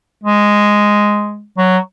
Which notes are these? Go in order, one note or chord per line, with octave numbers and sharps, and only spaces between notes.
G#3
F#3